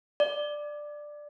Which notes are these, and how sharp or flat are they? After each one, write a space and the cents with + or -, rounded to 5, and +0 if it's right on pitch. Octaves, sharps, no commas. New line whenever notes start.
D5 +10